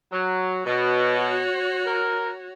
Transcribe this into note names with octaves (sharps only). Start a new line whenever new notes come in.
F#3
B2 F#4 C#5
A#4